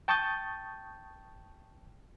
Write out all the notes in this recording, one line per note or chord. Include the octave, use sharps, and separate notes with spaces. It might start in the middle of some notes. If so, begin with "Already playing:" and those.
G5 A5 C#6 D#6 G6 A6